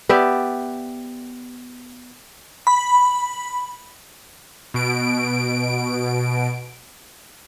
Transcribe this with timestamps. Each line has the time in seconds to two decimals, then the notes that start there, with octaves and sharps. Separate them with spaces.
0.09 B3 G4 D5 E5
2.67 B5
4.74 B2 D7